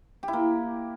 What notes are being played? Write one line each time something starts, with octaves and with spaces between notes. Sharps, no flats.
G4
E4
A#3